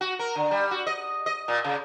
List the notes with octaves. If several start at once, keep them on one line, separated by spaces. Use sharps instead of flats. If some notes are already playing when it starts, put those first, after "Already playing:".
F#4
A#4
D3
G3
F#4
D#5
D#5
A#2
C#3